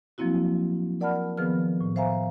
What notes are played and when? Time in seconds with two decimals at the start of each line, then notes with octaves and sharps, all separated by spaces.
0.18 F3 F#3 A#3 C4 E4 F#4
1.01 A#4 D5 F#5 A5 B5 F6
1.37 D#3 F3 B3 G#4 B4 F6
1.81 A2
1.96 C5 E5 F5 G#5 A#5